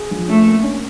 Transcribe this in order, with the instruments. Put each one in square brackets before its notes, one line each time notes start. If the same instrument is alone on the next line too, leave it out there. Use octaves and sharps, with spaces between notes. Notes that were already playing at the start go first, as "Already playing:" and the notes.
Already playing: [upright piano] G#4
F3
[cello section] A3 [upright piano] C#4
[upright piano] A#3
C#4